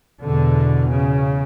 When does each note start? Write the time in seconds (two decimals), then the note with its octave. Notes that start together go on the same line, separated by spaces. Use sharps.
0.22 E2 B2 D3
0.90 C#3